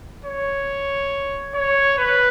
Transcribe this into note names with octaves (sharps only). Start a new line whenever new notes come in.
C#5
C#5
B4